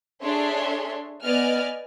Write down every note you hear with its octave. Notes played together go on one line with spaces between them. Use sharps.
D4 G#4 A4 C#5 E5 C6
B3 D5 D#5 G#5 F6